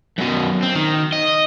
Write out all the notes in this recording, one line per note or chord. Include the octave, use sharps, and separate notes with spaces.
F#2 B2
C4
D#3
D#5